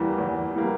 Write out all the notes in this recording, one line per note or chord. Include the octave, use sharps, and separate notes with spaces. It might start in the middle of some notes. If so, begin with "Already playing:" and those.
Already playing: E2 E3 G3 A#3
E2
E3 G3 A#3